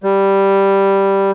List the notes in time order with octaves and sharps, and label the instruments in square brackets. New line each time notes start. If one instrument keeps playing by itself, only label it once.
[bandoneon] G3